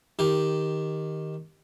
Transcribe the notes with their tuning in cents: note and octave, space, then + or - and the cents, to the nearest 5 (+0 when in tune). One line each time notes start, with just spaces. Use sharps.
D#3 +0 G4 +0